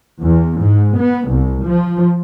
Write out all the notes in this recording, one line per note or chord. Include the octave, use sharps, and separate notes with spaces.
E2
G#2
B3
C2
F3